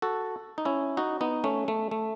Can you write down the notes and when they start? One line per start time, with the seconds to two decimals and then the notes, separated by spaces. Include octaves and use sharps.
0.02 F#4 A4
0.58 D#4
0.65 C#4 E4
0.97 D#4 F#4
1.21 B3 D#4
1.44 A3 C#4
1.68 A3
1.91 A3